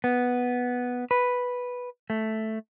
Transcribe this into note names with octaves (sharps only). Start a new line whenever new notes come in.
B3
B4
A3